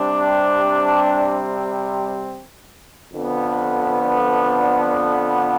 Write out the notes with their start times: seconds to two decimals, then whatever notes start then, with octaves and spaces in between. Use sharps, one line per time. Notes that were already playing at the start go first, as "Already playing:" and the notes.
Already playing: C3 G3 C4 D4
3.13 F2 D3 F3 B3
4.01 D4